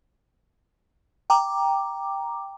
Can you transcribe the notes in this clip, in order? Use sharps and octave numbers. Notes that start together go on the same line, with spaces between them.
G5 A#5 D6